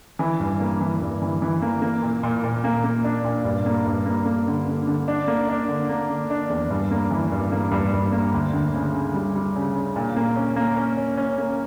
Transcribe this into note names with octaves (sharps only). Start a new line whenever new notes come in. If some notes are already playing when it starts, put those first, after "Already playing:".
E3
G2
A#3
E3
G2
E3
E3
A#3
A#3
A#2
A#2
A#2
A#3
A#3
D4
A#2
G2
A#3
G2
A#3
A#3
D3
D3
D3
D4
A#3
D4
D3
A#3
D3
D4
E2
G2
A#3
E3
G2
A#3
G2
G2
A#3
D2
D2
C#3
C#3
G3
G3
C#3
C#3
A#2
A#3
C#4
A#3
C#4
C#4
C#4
A#3